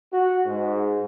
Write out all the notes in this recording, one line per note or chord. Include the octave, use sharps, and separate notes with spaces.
F#4
G#2